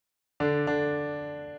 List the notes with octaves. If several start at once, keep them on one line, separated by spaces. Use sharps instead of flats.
D3 D4
D3 D4